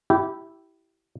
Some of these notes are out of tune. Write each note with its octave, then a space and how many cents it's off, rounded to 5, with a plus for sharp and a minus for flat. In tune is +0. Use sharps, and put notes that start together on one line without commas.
E4 +0 G4 -20